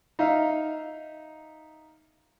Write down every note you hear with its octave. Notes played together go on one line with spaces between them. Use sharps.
D#4 E5 F5